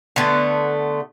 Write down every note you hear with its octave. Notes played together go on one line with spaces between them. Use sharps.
D3 A3 B3